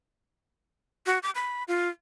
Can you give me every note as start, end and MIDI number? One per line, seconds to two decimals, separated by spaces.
1.06 1.19 66
1.23 1.30 86
1.35 1.63 83
1.68 1.89 65